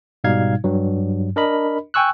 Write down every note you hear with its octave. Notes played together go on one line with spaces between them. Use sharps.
G#2 B2 G3 D#4 F5 G#6
G2 F#3
D4 A#4 D#5 B5
G5 G#5 C#6 E6 F#6